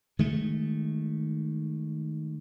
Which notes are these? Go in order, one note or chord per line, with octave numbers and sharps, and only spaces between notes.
D#3 G#3 A3